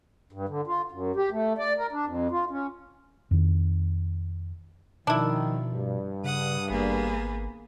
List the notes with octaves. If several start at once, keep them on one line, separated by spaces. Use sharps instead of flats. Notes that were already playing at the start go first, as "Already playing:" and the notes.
G2
D3
F4
F#2
G4
A3
D5
A#4
D4
F2
F4
C#4
F2 D#3
B2 D#3 F3 D4 E4
G2
C#3 F#5 D#6
G#1 A#3 B3 G#4